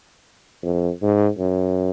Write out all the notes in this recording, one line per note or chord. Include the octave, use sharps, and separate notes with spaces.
F2
G#2
F#2